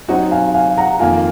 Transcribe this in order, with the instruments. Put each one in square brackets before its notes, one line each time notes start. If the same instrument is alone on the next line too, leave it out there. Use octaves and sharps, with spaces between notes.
[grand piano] F#3 C4 D#4 F#4 [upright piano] D#5 F#5
[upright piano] F5 G#5
F5 G#5
F#5 A#5
[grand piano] F2 D#3 A#3 F4 [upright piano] F5 G#5